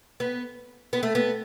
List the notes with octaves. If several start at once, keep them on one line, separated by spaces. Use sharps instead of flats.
B3
B3
A3
B3